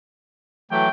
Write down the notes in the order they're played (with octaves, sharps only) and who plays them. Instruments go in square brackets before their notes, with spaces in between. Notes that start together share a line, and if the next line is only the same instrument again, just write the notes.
[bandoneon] E3 F#3 A3 [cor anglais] G5